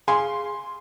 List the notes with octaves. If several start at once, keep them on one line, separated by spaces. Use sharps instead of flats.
G#4 F5 G#5 C6